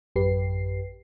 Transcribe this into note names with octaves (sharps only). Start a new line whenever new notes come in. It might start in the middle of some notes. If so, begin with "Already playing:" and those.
A1 F#2 G4 B4 C7